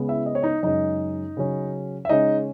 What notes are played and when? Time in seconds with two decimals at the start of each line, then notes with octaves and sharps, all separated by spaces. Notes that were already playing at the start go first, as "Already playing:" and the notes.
Already playing: C#3 G#3 B3
0.09 E4 E5
0.26 D#5
0.35 C#5
0.42 D#4 D#5
0.63 F#2 C#3 G#3 C#4 D#4 D#5
1.37 C#3 F#3 C#4
2.05 E5
2.09 C#3 G#3 C#4 D#4 D#5